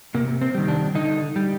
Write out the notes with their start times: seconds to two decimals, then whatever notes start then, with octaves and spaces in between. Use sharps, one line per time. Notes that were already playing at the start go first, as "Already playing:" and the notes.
0.14 C3 A#3
0.41 C4
0.55 D#3 G3
0.68 D4
0.95 D3 D#4
1.36 G3